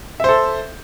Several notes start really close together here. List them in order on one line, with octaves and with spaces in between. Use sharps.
E5 C5 A4